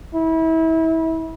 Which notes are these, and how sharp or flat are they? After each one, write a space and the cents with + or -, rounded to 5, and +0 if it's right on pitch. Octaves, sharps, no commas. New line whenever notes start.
E4 -30